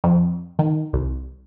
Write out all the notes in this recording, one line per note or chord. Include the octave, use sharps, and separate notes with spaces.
F2
D#3
C2